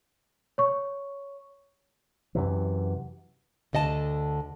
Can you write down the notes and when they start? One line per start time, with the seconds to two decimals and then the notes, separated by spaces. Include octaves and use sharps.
0.58 C#5 C#6
2.35 F#2 C3 E3
3.73 D2 D3 D#5 F#5 A5